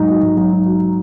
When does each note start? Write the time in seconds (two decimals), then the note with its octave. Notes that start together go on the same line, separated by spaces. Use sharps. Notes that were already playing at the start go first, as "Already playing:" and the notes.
Already playing: G#2 F#3 D#4
0.09 F#4
0.23 G#2
0.37 F#3
0.52 D#4
0.66 F#4